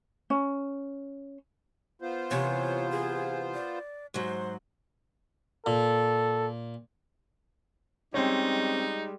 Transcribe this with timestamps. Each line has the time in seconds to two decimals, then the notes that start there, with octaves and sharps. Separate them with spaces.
0.30 C#4
2.02 B3 F4 C5
2.31 C3 E3 C#5
2.91 G#4
3.54 D5
4.14 G#2 F#3 C5
5.66 A#2 A4
8.14 G3 G#3 C4 C#4 D#4